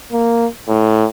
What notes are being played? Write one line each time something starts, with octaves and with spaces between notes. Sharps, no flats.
A#3
A2